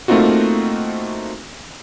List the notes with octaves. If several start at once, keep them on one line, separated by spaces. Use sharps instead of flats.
A3 A#3 C4 D#4 F4 F#4